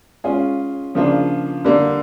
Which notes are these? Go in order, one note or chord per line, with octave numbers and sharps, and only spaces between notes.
G#3 C#4 F4 G#4
C#3 F3 A#3 D4 F4
D3 G3 A#3